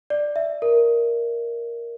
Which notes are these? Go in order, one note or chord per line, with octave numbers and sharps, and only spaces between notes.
D5
E5
A#4